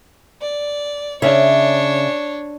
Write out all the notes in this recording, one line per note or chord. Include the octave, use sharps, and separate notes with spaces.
D5
C#3 D4 C#5 E5